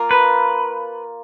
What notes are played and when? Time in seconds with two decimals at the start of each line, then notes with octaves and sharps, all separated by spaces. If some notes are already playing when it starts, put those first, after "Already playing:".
Already playing: A#3 F4 A#4
0.11 B4